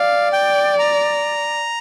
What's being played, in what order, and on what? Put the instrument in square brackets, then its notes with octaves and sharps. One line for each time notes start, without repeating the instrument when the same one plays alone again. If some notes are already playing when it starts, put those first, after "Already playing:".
Already playing: [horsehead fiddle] D5 [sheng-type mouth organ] F5
[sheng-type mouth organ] G5
A#5